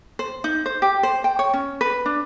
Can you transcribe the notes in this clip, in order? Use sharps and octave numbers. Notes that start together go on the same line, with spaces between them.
C5
D#4
C5
G4
C5
G5
C#5
C#4
B4
D4